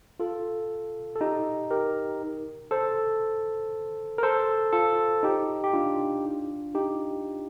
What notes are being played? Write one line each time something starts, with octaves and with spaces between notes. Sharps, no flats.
F4 A4
A4
D#4 G4
G4 A#4
A4 C5
A#4
A4 C5
F4 A4
D#4 G4
G4
D4 F4
D#4 G4